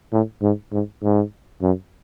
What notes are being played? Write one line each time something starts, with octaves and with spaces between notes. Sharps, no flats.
A2
G#2
G#2
G#2
F#2